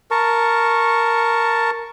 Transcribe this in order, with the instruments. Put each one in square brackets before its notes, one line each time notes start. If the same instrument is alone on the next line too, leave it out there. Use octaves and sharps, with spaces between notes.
[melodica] A#4 A5 C#6